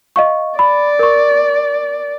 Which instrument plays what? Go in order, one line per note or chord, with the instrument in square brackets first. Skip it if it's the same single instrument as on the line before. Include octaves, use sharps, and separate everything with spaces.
[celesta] D#5 F5 C#6
[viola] D5 [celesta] B5
[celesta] A#4 C#6